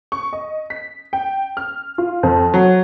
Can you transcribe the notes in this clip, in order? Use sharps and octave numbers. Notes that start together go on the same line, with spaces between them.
C#6
D#5
B6
G5
F6
F4
F2
F#3